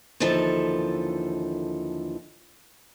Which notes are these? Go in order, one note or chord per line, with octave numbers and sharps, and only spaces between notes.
D#2 D3 E3 F3 A4